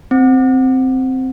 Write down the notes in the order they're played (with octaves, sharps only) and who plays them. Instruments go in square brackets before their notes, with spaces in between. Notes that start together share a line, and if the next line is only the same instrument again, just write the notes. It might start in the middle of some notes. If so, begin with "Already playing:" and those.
[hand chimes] C4